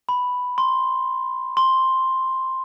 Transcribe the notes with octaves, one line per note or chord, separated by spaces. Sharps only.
B5
C6
C6